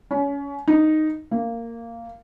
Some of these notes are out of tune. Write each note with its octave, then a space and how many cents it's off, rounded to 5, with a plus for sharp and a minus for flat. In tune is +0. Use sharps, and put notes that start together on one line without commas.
C#4 +25
D#4 -5
A#3 -10